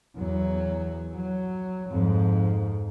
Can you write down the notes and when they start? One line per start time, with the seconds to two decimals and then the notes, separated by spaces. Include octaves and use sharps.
0.16 E2 F#3
1.16 F#3
1.91 F2 G#2